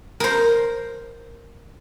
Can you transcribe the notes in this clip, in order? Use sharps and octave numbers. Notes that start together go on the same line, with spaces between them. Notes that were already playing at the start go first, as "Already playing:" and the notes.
A#4 C5